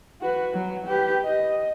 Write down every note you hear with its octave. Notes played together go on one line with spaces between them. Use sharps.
F#4 B4
F#3
G4 B4
D#5